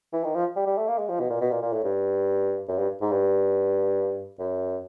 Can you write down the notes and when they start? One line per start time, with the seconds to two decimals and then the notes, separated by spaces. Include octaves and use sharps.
0.13 E3
0.24 D#3
0.35 F3
0.56 G3
0.66 G3
0.77 A3
0.87 A#3
0.98 G#3
1.09 F3
1.20 B2
1.30 A#2
1.41 B2
1.51 A#2
1.62 A#2
1.73 A2
1.84 G2
2.68 F#2
2.78 G2
3.01 G#2
3.11 G2
4.39 F#2